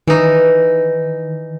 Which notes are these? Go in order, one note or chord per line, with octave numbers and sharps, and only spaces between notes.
D#3 E3 D#4